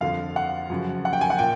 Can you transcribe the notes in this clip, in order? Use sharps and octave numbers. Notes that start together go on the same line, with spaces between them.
F2 D3 F3 F5
F#5
F#2 C#3 F3
F#5
G5
G#5
F#5
A#2 G5